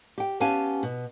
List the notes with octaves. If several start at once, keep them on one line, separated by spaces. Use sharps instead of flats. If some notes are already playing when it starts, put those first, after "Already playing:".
G4 G5
B3 C#4 G4 F5 G#5 A5
B2